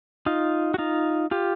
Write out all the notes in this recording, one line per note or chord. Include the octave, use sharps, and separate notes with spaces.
D#4 F4
F#4
D#4 F4
F4 G4